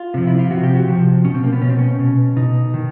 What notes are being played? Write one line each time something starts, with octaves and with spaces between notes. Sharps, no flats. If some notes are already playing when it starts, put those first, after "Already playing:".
Already playing: F4
C3 F3
E4
F4
C3 F3 F#4
G4
F#4
C3 F3
B2 C#4
C4
A#3
B3
B2 C#4
C4
C#4
B2
B2 D#4
D#3